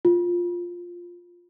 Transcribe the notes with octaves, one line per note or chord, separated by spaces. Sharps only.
F4